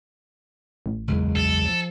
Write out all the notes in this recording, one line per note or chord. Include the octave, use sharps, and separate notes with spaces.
A1
F#1 E2 G#3
A#1 A4
F3 F#3